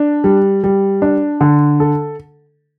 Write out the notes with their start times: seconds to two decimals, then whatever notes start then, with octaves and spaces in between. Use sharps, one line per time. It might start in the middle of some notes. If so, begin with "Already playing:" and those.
Already playing: D4
0.24 G3
0.64 G3
1.02 D4
1.41 D3
1.80 A4